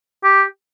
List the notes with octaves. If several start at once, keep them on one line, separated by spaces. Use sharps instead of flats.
G4